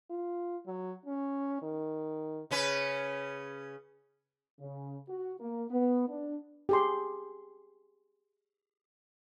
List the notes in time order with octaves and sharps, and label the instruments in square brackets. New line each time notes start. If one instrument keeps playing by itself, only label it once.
[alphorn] F4
F#3
C#4
D#3
[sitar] C#3 C#4 B4
[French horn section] C#3
F#4
A#3
B3
D4
[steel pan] G4 G#4 C6